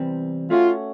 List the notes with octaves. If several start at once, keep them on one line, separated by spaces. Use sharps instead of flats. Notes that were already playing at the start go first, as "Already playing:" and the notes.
Already playing: E2 C3 E3 G3 C4
A3 C#4 F4 F#4